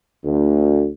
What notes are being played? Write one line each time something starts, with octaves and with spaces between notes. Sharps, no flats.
D2